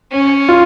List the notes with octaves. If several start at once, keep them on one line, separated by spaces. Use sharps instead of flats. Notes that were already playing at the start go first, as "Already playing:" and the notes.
C#4
F4